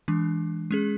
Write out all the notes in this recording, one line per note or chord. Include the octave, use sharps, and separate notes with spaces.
E3 G#3 D4
G#3 C#4 G#4